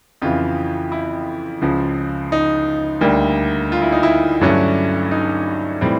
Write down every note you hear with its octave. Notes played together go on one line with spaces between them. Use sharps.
F2 C#3 E3 F4
E4
C#2 C#3 F3
D#4
D2 D3 G3 A#3
F4
E4
D#4
E4
G2 D3 F#3 A3 C#4
D#4
A2 E3 G3 C4